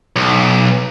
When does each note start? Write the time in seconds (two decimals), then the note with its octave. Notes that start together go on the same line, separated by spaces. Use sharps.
0.16 B1